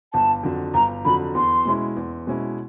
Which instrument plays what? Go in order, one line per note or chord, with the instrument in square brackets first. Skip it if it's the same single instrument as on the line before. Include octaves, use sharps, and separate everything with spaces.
[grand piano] G1 [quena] A5
[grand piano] F2 D3 F#3
[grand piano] G1 [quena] A#5
[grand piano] F2 D3 F#3 [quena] B5
[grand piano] E2 [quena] C6
[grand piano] B2 G#3 C#4 E4
E2
B2 G#3 C#4 E4